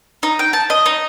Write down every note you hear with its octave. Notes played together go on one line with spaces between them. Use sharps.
D#4
G5
A5
D#5
D#4